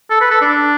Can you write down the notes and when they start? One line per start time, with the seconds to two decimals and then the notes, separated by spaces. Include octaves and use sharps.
0.10 A4
0.21 B4
0.31 A4
0.41 D4